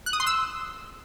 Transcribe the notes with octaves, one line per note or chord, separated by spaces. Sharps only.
F#6
D#6
C6
E6